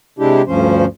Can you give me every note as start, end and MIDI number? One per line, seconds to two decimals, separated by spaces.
0.19 0.42 48
0.19 0.42 56
0.19 0.42 62
0.19 0.42 64
0.19 0.42 67
0.47 0.85 38
0.47 0.85 43
0.47 0.85 53
0.47 0.85 61
0.47 0.85 72